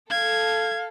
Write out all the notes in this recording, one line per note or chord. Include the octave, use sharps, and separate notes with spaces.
A4 F5 G#6